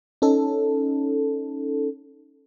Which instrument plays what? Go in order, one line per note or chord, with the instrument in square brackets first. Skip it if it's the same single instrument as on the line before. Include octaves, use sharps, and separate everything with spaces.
[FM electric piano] C#4 D#4 A4